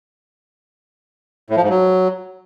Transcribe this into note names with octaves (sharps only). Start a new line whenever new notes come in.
A2
F3
G#2
F#3